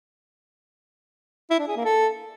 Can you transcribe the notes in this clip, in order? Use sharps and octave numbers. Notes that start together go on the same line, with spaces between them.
E4
D4
G#4
A#3
A4